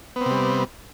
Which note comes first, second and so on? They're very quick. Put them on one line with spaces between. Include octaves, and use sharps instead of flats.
B3 C4 C3 G3